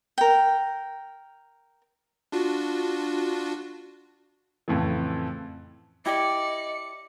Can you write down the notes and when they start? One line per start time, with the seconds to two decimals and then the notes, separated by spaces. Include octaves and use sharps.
0.18 A#4 G5
2.32 D4 F4 F#4
4.68 F2 A2 C#3 E3
6.06 E4 G4 D5 D#5 C#7